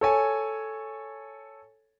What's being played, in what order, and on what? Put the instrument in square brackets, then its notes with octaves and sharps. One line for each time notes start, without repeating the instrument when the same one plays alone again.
[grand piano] A4 C#5 G#5